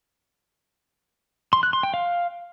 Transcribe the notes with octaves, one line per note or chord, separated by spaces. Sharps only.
C6
F#6
C6
G5
F5